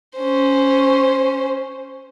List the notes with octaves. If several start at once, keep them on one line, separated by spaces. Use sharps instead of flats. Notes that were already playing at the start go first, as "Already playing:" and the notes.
C#4 C5